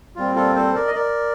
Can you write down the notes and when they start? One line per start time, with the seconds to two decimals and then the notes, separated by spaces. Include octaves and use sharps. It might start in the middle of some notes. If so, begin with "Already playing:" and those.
0.16 A#2 G3 C4 F4
0.35 F4 A4
0.55 A4 C5
0.74 A#4 D5
0.87 D#5
0.95 A#4 D5